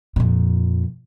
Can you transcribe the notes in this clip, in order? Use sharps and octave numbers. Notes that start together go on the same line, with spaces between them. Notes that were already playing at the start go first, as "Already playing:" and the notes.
F2 A#2